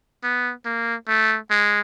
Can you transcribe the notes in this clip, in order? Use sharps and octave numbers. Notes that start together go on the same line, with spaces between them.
B3
A#3
A3
G#3